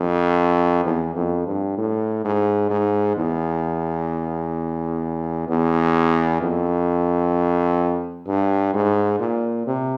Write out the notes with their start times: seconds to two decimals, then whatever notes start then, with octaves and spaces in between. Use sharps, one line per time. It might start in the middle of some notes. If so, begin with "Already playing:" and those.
Already playing: F2
0.85 E2
1.16 F2
1.47 G2
1.78 A2
2.24 G#2
2.70 G#2
3.16 E2
5.48 E2
6.41 F2
8.27 G2
8.74 G#2
9.19 A#2
9.66 C3